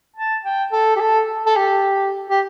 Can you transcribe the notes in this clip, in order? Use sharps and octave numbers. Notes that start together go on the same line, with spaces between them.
A5
G5
A4
G4
A4
A4
G4
G4